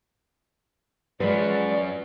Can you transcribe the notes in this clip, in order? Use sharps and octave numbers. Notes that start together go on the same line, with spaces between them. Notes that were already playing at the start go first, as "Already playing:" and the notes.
F#2 F3 F#3 G#3 B4 D5